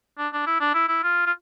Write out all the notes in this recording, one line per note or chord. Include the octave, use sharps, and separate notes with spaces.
D4
D4
E4
D4
E4
E4
F4
F4